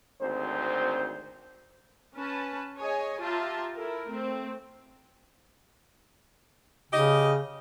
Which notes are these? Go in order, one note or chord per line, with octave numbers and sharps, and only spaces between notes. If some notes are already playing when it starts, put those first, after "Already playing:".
G#1 D2 C4 C5
C#4 B4 A5
G#4 C#5 D#5 G#5
F4 G4 E5 A5 A#5 C6
E4 A4 A#4
A3 C4
C#3 G4 D#5